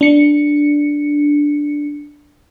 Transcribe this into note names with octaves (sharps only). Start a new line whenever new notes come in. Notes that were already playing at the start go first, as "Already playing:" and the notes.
D4 C#7